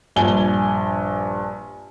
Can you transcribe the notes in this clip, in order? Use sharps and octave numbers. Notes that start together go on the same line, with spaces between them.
A#1 G2 G#5 G7